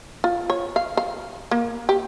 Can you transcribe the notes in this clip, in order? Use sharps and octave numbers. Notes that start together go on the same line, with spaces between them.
F4
C#5
F5
F5
A#3
G4